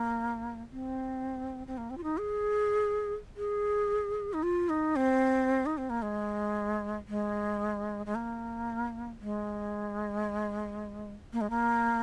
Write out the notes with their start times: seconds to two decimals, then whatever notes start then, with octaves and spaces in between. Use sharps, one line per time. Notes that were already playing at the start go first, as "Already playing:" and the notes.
Already playing: A#3
0.72 C4
1.67 C4
1.78 A#3
1.90 C4
1.98 F4
2.04 D#4
2.18 G#4
3.36 G#4
4.33 D#4
4.43 F4
4.69 D#4
4.96 C4
5.66 D#4
5.78 C4
5.90 A#3
6.02 G#3
7.08 G#3
8.06 G#3
8.15 A#3
9.21 G#3
11.33 A#3
11.41 G#3
11.50 A#3